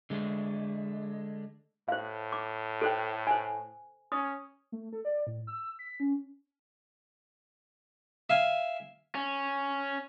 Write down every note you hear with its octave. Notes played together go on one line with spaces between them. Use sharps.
D3 G#3 A3
A2 C5 F5
D6
A4 C5 G5
C5 G#5
C#4 D#6
A3
A4
D5
A2
E6
B6
C#4
E5 F5 G#5
C#4